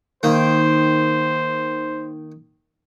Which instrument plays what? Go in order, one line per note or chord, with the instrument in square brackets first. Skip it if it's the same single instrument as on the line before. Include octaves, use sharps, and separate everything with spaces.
[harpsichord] D#3 A#3 [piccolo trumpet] C5